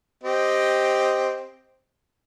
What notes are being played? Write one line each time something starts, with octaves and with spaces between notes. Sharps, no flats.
C4 G4 D#5